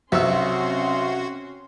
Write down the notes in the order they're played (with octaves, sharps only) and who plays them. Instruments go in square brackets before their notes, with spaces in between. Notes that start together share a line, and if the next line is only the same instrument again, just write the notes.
[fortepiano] B1 E6 [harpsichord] C3 [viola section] C4 C#4 C6 [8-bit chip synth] F#4